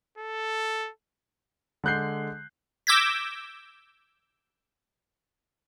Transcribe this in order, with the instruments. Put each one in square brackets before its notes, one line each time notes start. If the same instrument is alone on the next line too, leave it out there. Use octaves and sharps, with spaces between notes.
[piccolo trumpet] A4
[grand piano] D3 G#3 F#6 G6 C7
[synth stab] D6 E6 G6 G#6 A#6 B6